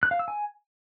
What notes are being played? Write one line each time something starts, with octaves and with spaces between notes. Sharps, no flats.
F#6
F5
E6
G#5